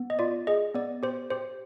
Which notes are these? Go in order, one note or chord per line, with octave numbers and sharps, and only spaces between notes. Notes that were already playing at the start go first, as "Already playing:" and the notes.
Already playing: B3
D#5
F4 D5
G#4 D#5
B3 D5
G4 C5
G4 C5